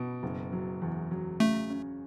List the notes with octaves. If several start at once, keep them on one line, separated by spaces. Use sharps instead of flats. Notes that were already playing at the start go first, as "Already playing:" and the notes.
Already playing: B2
F#1
F#3
E2
F#3
C#3 A3
C#4